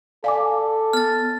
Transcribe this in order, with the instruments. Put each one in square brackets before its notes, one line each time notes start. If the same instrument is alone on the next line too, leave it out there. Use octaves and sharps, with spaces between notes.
[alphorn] A4 [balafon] D5 [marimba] F5 G#5 D6
[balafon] B3 [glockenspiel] F6 A6